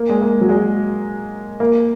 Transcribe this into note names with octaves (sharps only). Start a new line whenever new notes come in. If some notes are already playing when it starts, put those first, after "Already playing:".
Already playing: A#3
G#3
A#3
F#3
G#3
A#3